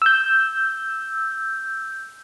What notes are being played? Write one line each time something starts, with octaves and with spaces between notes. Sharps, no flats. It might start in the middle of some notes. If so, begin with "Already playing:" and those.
E6 G6